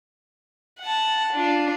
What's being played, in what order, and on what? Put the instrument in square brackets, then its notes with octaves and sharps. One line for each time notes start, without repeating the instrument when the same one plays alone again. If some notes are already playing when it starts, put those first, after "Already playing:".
[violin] F#5 A5
D4 F4